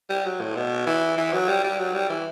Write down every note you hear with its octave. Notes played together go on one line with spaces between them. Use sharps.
G3
F#3
A2
B2
E3
E3
F#3
G3
G3
F#3
G3
E3